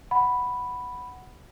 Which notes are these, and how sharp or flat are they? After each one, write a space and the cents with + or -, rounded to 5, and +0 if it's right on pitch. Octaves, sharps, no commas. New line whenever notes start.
F#5 +0 B5 +0